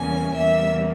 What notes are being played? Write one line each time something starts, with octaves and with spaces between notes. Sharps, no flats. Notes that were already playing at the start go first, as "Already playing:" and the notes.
Already playing: E2 C#3 G3 A#3 C#4 G#5
E2 C#3 G3 A#3 E5